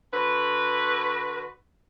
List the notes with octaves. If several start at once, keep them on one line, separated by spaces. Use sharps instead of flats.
D3 F#4 B4